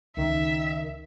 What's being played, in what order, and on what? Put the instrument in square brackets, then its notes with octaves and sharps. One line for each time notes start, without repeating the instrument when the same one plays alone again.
[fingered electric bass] C#2 [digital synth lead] D#3 [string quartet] E5